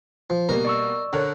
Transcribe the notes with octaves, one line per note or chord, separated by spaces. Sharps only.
F3
B2 G3 A#3 A#4
D5 C#6 E6
D3 A4 A#4 C#5 F#6